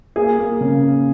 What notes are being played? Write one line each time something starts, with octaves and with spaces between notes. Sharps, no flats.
A#3 G#4
A#3
C#3
A#3